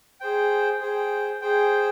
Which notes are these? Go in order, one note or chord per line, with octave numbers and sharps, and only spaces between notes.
G#4 C5 G5
G#4 C5 G5
G#4 C5 G5